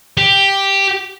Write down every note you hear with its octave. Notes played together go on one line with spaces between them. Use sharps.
G4